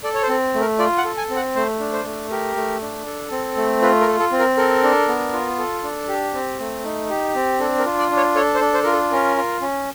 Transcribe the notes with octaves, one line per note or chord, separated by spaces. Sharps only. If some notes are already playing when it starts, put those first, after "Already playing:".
A4 D5
C#5
C5
C4
A3
A#4
F4 D5
F#5
A4
G#5
C4
F#5
A3 C5
D4
C5
A3
G4 A#4
A3
D4
A4
C4
A3
F4 B4
A#4
A4
A4
C4
A#4
A4 A#4
D4
B3
F4
A4
D4
G4
C4
A3
D#4
G4
C4
D4 A4
A#4
F4
D5
D4
C#5
A4 C#5
C5
D4
C5
F4 A#4
A4
C#4 A#4
F4
C#4